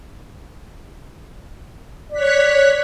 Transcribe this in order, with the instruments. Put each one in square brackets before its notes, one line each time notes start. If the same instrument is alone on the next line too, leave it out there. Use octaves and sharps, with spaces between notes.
[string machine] C#5 F#6 B6 [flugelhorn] D5